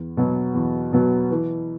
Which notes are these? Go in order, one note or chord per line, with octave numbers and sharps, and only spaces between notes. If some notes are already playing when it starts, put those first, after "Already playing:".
Already playing: E2
B2 F#3 B3
E2
B2 F#3 B3
E3